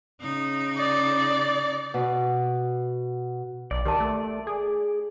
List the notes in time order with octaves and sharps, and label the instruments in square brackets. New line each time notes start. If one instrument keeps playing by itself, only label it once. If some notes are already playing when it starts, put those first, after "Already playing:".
[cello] C#3 D#4
[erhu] D5
[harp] B2
[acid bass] B1 [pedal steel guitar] D5
[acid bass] D#3 [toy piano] G4 A#4 A5
[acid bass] A3
G#4